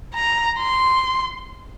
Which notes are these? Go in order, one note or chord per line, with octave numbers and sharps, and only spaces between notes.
A#5
C6